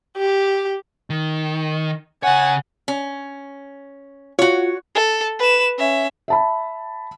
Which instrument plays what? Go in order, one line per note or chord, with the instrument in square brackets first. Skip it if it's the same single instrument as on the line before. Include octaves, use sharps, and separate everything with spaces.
[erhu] G4
[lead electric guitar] D#3
[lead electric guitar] C#3 C#5 [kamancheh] F#5 G#5
[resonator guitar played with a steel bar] C#4
[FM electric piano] F4 [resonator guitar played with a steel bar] F#4 C#5
[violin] A4
B4 E7
C#4 E5
[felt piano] E5 A5 B5